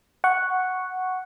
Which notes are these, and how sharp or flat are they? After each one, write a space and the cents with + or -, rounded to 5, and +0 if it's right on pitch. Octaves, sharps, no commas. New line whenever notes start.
F#5 +0 C#6 +0